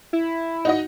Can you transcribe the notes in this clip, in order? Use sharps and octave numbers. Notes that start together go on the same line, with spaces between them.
E4
D#4 F#4 D#5